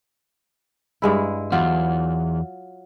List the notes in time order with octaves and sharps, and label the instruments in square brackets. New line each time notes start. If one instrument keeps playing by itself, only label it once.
[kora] G2 G#3 E4
[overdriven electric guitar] E2 [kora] F#3 F4